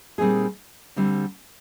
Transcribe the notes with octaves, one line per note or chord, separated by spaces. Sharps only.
A#2 G3 C4 D#4 G#4
D2 D3 G3 C4